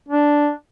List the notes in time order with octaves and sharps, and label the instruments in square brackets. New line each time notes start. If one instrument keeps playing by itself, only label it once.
[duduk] D4